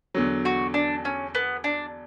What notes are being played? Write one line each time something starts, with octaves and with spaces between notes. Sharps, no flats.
E2 D3 F#3
F#4
D4
C#4
B3
D4